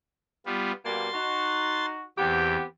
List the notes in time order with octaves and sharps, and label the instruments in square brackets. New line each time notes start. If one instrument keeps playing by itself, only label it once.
[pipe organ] G3 B3 F4
[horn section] B2 G3 A#3 [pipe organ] C6 A6
[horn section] D#4 F#4
[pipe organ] E2 [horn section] B3 C4 G4